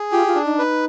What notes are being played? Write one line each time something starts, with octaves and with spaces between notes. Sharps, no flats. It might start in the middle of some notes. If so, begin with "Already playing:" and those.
Already playing: G#4
F4 G4
F4
D4
D#4
B4